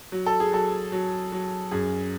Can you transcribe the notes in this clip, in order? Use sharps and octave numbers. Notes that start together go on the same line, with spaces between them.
F#3
A4
G#4
F#3 A4
F#3
F#3
F#2 G#4